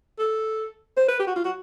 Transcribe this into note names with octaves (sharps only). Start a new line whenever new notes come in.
A4
C5
B4
G4
F#4
F4
F#4